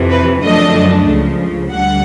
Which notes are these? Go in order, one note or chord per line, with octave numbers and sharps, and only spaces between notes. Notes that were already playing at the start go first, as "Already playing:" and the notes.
Already playing: F2 C3 E3
B4
F#2 D3 F3 A3 D4 D#5
C#2 C#3 F3
D2 D3 G3 F#5